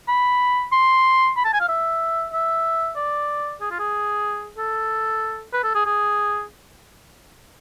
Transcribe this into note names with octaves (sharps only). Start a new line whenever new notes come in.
B5
C6
B5
A5
G#5
F5
E5
E5
D5
G#4
F4
G#4
A4
B4
A4
G#4
G#4